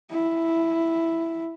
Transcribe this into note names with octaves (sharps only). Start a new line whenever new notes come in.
E4